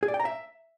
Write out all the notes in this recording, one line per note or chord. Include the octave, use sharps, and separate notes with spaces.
G#4
D5
G5
A#5
E5